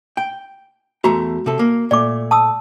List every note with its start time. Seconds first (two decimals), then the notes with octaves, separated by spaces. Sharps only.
0.17 G5
1.04 E2 A3 F#4 A#5
1.46 C3 A4
1.59 A#3
1.91 A#2 A3 D5 D6
2.31 A5 D#6 E6